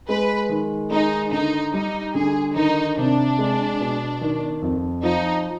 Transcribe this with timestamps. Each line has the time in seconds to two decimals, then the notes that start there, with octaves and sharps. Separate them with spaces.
0.09 G#3 B4
0.49 D#3
0.91 G#3 D#4
1.32 D3 D#4
1.74 G3 D#4
2.15 D3 G#4
2.55 D#3 D#4
2.97 C3 D4
3.39 G#3
3.80 B2
4.21 D#3
4.62 F2
5.03 F3 D#4